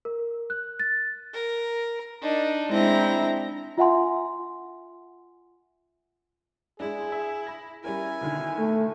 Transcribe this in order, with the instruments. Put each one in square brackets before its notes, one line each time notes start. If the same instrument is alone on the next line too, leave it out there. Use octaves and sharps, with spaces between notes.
[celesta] A#4
F#6
A6
[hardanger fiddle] A#4
D4 D#4
[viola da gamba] G#3 D4 E4 [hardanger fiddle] C4 A#5
[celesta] F4 E5 F#5 G#5 C6
[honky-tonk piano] G#3 D4 [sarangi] E4 [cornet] G#4
[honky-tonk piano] E5
B5 A#6
[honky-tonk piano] G3 C#4 A#4 [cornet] E4 [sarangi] G#5
[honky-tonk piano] B2 D3 D#3
[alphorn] A3